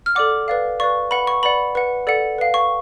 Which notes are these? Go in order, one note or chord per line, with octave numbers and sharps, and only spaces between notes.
F6
A4 D5 F#5 D6
B4 D5 F5
B4 D5 F5 C#6
B4 F#5 B5
C#6
B4 D5 F#5 B5
B4 F#5
A4 D5 F#5
B4 F5
C#6